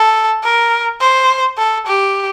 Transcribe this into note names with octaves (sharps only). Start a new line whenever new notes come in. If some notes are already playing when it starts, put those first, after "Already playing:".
Already playing: A4
A#4
C5
A4
G4